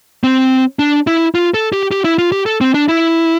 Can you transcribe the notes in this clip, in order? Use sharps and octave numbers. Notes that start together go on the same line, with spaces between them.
C4
D4
E4
F4
A4
G4
G4
E4
F4
G4
A4
C4
D4
E4